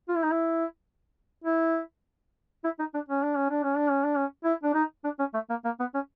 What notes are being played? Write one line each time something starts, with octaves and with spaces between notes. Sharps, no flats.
F4
E4
D#4
E4
E4
E4
D#4
D4
C#4
D4
C#4
D4
C#4
D4
C#4
D4
C#4
E4
D4
D#4
D4
C#4
A3
A#3
A#3
B3
C#4